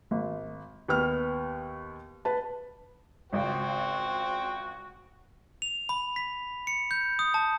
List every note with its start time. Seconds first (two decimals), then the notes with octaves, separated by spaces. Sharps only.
0.11 G#1
0.88 D#2 B3 F6
2.25 B4 A5
3.33 G#1 C#2 F#4 C5 G5
5.62 F7
5.89 B5
6.16 B6
6.67 C#7
6.91 G6
7.19 D#6
7.34 A5